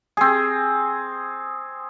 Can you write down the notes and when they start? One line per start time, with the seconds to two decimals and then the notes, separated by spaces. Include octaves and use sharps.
0.17 C4 G#4